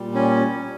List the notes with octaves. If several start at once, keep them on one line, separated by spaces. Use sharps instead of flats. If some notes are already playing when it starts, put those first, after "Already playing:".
Already playing: A#2 G3
C#4